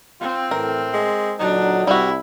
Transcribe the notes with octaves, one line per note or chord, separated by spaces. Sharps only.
C4 F4
A2 E3 A#4
G#3
A#2 D3 F#3 D4 D#4
C2 G3 E4 F#4